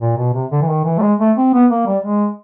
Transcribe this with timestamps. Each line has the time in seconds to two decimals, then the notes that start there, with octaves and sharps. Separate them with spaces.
0.01 A#2
0.17 B2
0.34 C3
0.51 D3
0.61 E3
0.69 D#3
0.85 E3
0.98 A3
1.02 G#3
1.20 A3
1.37 C4
1.54 B3
1.71 A#3
1.86 G3
2.04 G#3